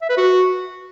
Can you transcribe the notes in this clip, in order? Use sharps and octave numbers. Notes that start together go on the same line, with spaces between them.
E5
B4
F#4